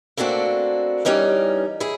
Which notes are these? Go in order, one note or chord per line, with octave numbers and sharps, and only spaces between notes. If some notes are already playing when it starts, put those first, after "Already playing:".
A3 A#3 C4 D4 F#4
E3 G3 C#4 D#4 A#4
E4 G#4